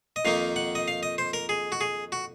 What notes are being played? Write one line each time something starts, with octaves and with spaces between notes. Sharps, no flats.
D#5
F2 D#3 A#3 D#4 F5
F#5
D#5
F5
D#5
C5
A#4
G#4
F#4
G#4
F#4